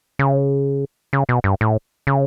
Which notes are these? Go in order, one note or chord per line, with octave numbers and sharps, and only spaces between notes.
C#3
C#3
B2
G2
A2
C#3